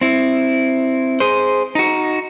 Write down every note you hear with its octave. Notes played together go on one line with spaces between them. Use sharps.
C4 E4
G#4 C5
D#4 F#4